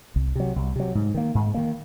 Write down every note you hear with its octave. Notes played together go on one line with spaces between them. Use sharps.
C2
C3 F#3
C2
C3 F#3
G#2
D#3 A#3
G#2
D#3 A#3